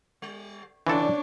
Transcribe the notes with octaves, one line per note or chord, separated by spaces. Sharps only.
G3
C3 E3 D4 F4 A4 C#5 D5